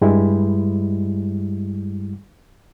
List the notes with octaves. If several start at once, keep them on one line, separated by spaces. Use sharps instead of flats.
G2 G3 G#3 E4